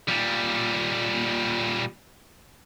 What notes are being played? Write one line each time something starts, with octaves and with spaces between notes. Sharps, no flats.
A#2 G3